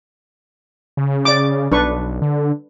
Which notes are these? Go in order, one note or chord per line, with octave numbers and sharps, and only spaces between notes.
C#3
D5 D6
B1 D4 B4 C#6
D3